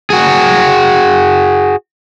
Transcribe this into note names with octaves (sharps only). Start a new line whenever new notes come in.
F#4 G#4